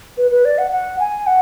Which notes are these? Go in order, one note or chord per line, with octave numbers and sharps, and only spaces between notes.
B4
B4
D5
F#5
F#5
G#5
F#5